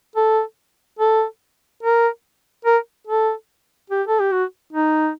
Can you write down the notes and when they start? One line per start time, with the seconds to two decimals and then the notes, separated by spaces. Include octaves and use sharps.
0.16 A4
0.99 A4
1.83 A#4
2.65 A#4
3.07 A4
3.90 G4
4.07 A4
4.20 G4
4.32 F#4
4.73 D#4